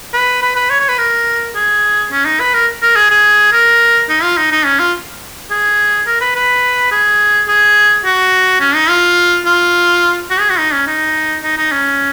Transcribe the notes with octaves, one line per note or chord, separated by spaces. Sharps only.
B4
B4
B4
C#5
C#5
B4
A#4
G#4
C#4
D#4
B4
A#4
A#4
G#4
G#4
A#4
D#4
F4
D#4
D#4
C#4
F4
G#4
A#4
B4
B4
G#4
G#4
F#4
C#4
D#4
F4
F4
F#4
G#4
F#4
D#4
C#4
D#4
D#4
D#4
C#4